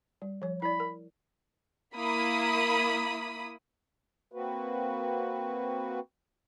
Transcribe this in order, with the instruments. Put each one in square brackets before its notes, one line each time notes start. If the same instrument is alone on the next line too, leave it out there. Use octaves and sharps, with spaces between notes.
[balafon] G3
F3 C#5
[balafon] E4 D5 [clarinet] B5
[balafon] A#4
[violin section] A#3 E4 B5 D#6
[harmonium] A#3 C4 F#4 B4